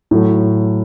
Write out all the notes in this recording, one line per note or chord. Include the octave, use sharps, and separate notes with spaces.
A2 F#3 A3